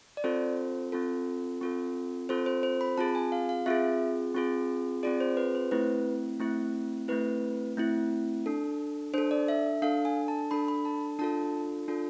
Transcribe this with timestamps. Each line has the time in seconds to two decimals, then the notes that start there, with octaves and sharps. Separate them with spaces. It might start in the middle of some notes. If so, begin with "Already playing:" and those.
0.17 D5
0.24 C4 F4 A4 C5
0.92 C4 F4 A4
1.61 C4 F4 A4
2.29 C4 F4 A4 C5
2.46 C5
2.63 C5
2.81 B5
2.98 C4 F4 G#4 A5
3.15 G#5
3.32 F5
3.49 F5
3.66 C4 F4 G#4 E5
4.34 C4 F4 G#4
5.03 C4 F4 G#4 D5
5.20 C5
5.37 B4
5.55 C5
5.71 A3 C4 E4 B4
6.40 A3 C4 E4
7.08 A3 C4 E4 B4
7.77 A3 C4 E4
8.46 D4 A4
9.14 D4 A4 C5
9.31 D5
9.48 E5
9.82 D4 A4 F5
10.05 G#5
10.28 A5
10.51 D4 A4 B5
10.68 B5
10.85 A5
11.19 D4 F4 A4 A5
11.88 D4 F4 A4